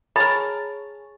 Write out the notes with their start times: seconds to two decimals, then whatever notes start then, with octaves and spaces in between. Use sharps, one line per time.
0.16 G#4 A#4 C#5 A5 B5